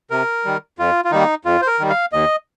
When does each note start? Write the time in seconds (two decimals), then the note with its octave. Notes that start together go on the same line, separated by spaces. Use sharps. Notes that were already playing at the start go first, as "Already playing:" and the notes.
0.11 C3 A#4
0.45 D#3 G3
0.79 F2 F4
1.05 F4
1.11 D#3 G3 A#3 D#4
1.45 F2 F4
1.62 C5
1.67 A#4
1.79 D#3 G3
1.90 F5
2.13 D#2 D#5